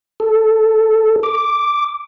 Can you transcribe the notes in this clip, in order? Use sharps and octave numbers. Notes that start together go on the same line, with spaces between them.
A4
D6